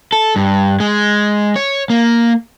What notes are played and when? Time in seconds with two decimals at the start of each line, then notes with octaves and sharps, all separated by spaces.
0.13 A4
0.36 G2
0.80 G#3
1.56 C#5
1.90 A#3